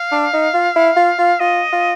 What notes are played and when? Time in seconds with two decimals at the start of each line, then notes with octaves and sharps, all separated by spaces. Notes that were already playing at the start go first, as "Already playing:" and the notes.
Already playing: F5
0.12 D4
0.33 D#4
0.54 F4
0.76 E4
0.96 F4
1.19 F4
1.40 F4 D#5
1.72 F4